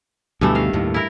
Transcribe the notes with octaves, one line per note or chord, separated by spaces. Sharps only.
D2 G2 B2 E3 A3
D#3 F5
D#2 A2
E4 A#4